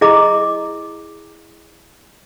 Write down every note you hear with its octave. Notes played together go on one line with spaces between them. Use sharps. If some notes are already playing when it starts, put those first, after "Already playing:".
E4 G#4 D#5 A#5 D6